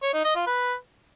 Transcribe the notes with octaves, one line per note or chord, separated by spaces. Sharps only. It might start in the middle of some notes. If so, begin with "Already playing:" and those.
C#5
D#4
D#5
F4
B4